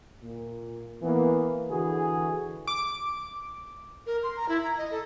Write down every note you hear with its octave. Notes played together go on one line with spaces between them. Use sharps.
A#2
E3 A#3 B3
D3 E3 F#4 G#4
D6
A#4
C6
A#5
E4
A#5
D#5
A4